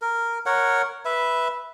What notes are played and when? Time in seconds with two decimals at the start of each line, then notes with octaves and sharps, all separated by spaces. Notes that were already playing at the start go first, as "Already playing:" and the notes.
0.02 A#4
0.46 A#4 C#5 F#5
1.05 B4 E5